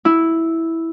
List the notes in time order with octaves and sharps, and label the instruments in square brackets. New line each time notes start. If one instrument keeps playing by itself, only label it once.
[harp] E4